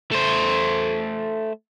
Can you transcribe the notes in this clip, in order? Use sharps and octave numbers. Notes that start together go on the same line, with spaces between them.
A3 C5